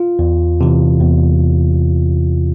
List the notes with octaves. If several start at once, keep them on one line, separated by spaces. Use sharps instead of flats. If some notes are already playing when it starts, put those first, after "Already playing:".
Already playing: F4
E2
C3 E3
E2